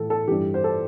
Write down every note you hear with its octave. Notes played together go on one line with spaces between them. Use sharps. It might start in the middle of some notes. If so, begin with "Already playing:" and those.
Already playing: A2 E3 A4
A4
G2 E3 G4
C5
A4